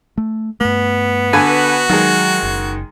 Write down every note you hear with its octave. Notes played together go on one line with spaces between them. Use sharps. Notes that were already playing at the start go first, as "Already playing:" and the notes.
A3
G2 A3 B3
D3 F#4 B4 G#5
D#3 F#3 G#3
F#1